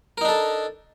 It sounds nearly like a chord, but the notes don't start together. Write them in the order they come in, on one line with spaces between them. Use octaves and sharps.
A#4 D#4 D4 A4